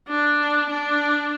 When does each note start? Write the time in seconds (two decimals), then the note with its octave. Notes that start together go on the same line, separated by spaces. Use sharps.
0.08 D4
0.70 D4